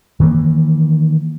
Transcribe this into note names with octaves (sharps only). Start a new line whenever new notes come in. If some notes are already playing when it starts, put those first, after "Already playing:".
D#3 E3 A3 A#3